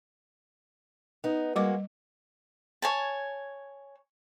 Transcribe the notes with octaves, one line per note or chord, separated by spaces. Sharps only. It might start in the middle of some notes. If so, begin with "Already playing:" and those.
B3 D#4
G3 G#3 A#3 F#4 D6
C#5 G#5 A5